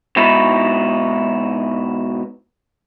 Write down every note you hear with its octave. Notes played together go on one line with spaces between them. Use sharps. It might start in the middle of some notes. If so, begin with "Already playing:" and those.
G#2 B2 D#4 E4